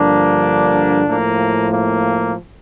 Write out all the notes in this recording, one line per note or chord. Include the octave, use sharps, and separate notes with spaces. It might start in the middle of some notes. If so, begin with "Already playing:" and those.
Already playing: G2 D3 F3 A#3 D4
A2 F3 A#3
A#3